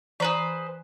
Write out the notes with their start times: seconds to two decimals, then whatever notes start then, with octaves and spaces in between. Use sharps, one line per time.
0.20 E3 G#4 B4 C5 A#5